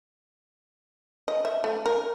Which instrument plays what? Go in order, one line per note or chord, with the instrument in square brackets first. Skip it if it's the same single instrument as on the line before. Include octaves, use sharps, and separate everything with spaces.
[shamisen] D#5
E5
A3
A#4